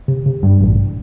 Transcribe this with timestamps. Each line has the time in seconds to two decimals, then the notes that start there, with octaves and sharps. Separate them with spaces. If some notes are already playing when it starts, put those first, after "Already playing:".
0.08 C3
0.26 C3
0.43 G2
0.61 A1